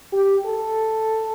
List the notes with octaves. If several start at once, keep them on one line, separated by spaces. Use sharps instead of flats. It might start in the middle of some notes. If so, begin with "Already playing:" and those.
G4
A4